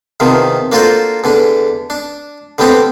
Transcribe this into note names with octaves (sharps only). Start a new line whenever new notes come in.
E2 C3 D#3 F3
A#3 D4 F4 F#4 A4 C5
E2 D3 D4
D4
D3 G3 B3 C4 D4